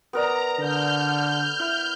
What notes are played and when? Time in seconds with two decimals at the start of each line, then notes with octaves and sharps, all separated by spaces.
0.13 B3 A#4 D5 A#5
0.59 D3 F6 G6
1.59 E4